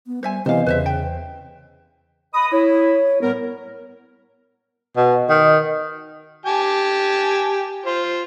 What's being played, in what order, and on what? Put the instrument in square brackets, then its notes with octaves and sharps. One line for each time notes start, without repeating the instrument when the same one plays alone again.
[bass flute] B3
[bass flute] G3 [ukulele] C5 E5 G#5
[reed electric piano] C3 E3 B3 [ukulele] C5 F5 [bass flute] D#5
[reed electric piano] E2 [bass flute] C#3 [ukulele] B4 C5 E5
[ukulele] G5
[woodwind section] B4 D#5 D#6 [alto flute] B5
[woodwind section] E4 [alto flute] C#5
[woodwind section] A2 G3 A#4 [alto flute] B3
[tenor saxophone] B2
D#3
[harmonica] G4 G#5 A5
F4 C5